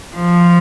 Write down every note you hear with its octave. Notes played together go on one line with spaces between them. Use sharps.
F3